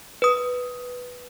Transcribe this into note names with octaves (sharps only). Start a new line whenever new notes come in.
B4 D#6